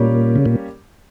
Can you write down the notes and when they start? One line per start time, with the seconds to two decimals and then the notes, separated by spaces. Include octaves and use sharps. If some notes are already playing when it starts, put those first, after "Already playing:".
Already playing: A#2 G3 A#3 C#4 G4
0.36 C#3
0.46 A#2